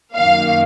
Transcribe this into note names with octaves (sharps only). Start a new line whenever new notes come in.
F#2 D#3 A#3 F5